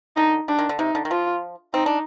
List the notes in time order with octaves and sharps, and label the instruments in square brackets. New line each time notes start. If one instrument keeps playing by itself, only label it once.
[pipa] D3 [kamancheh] D#4
[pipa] G3 [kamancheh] D4
[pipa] D#3
D3
[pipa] C3 [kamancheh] D#4
[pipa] D3
D#3
[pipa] F3 [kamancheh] F4
[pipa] C4 [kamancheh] D#4
[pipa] D4